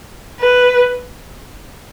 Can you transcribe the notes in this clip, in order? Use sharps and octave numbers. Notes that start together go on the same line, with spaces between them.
B4